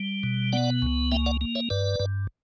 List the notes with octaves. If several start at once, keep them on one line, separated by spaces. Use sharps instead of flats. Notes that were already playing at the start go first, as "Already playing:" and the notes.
Already playing: G3
B2
B3 D5 F#5
C#2
A#3 E5 G5
D5 F#5
A#3
C#5 E5
G2 B4 D5
G2